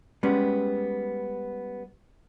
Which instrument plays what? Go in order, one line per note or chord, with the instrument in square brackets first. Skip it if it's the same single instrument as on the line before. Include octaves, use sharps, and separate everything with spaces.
[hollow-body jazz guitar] G3 G#3 B3 C#4